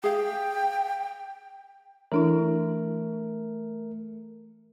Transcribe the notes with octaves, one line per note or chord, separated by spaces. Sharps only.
G#4 F5 G5
E3 A3 D4 E4 A#4